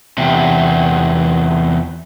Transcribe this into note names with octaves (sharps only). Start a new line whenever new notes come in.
E2 C3